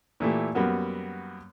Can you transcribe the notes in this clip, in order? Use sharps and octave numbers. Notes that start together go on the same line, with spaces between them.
A#2 E3 A3 G4
F#2 G3 A#3 B3 F#4